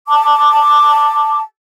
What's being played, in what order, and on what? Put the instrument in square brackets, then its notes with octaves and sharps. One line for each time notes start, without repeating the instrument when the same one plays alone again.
[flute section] A5 D6